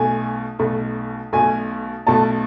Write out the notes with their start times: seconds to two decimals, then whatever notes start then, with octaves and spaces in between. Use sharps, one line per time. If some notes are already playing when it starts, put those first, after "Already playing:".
Already playing: B1 B2 A3 G#5
0.59 B1 B2 A3
1.33 B1 B2 A3 G#5
2.07 B1 B2 A3 A5